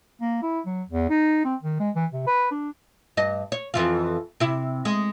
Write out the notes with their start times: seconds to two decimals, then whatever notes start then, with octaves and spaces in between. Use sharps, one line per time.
0.21 A#3
0.42 E4
0.66 F#3
0.89 E2
1.09 D#4
1.45 C4
1.62 D#3
1.80 G#3
1.95 E3
2.12 C3
2.27 B4
2.51 D4
3.17 G2 D#5
3.52 C#5
3.74 F2 E3 F4
4.40 C3 E4
4.85 G#3